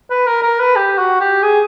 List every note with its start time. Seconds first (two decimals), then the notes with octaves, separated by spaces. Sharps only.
0.10 B4
0.27 A#4
0.43 A#4
0.59 B4
0.76 G4
0.98 F#4
1.20 G4
1.43 G#4